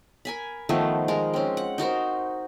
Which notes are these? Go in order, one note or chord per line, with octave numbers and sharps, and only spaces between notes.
A#4 G#5 B5
D#3 F3 A3 B3
G#3 A#4
C4 C#4
F#5
D#4 F#4 A#4 C5